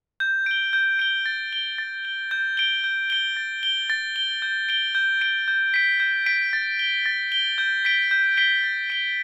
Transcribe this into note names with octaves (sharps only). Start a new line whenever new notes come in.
G6
D7 G7
G6
D7 G7
A6
G7
A6
G7
G6
D7 G7
G6
D7 G7
A6
G7
A6
G7
G6
D7 G7
G6
D7 G7
G6
B6 D7
G6
B6 D7
A6
G7
A6
G7
G6
B6 D7 G7
G6
B6 D7 G7
A6
D7 G7